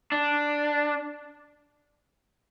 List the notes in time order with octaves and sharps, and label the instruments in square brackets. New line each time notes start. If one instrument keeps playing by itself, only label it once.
[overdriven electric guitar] D4